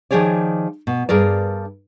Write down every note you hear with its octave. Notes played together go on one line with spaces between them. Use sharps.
D#3 F3 G4 G#4 C#5 D5
B2
G2 G#4 A#4 D5